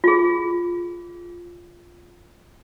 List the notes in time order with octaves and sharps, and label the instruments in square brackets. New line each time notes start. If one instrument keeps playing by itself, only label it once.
[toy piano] F4 G#4